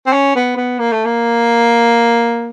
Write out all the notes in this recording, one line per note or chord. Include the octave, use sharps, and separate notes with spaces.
C4
C#4
B3
B3
A#3
A3
A#3